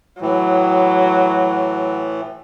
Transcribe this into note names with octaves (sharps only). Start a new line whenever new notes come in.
A2 E3 F#3